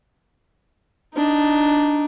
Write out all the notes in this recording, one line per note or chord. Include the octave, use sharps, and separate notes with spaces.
D4 D#4